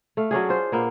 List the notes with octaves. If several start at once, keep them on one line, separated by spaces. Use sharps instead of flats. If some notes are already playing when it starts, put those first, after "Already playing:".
A3 F5
F#3 C#4 D4 G#4
F4 C5
A#2 A#3 B3